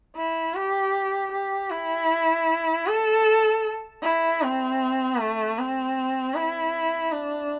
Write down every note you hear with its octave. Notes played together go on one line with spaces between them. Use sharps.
E4
G4
G4
E4
A4
E4
C4
A3
C4
E4
D4